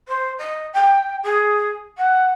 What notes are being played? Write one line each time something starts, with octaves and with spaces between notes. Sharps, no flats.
C5
D#5
G5
G#4
F#5